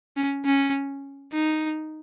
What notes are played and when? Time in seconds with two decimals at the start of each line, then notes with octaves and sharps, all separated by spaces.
0.17 C#4
0.45 C#4
1.33 D#4